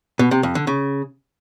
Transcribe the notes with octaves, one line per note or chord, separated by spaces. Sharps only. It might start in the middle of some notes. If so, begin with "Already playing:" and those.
B2
C3
F2
D3
C#3